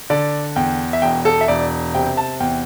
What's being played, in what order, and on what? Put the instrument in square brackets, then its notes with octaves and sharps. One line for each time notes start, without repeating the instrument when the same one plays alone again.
[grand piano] D3 D5
E2 G5
E5
E1 G5
A4
E5
E1 D5
C3 G5
A5
E2 G5